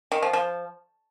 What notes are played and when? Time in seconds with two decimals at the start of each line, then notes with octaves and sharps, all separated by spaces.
0.12 D#3
0.22 F3
0.33 F3